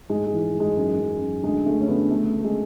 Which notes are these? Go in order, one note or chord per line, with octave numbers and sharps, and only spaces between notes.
G#2 G#3
G#3
E3
G#2
G#3
F#2
F#2
F#2
D2 G#3
D2 A3
C#4
D2 B3
C#2 A3
C#2
G#3